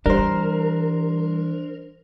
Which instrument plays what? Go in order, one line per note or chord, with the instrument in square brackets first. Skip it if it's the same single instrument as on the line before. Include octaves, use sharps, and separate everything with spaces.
[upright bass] E3 [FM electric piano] G3 [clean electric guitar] D4 C5 [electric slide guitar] A#4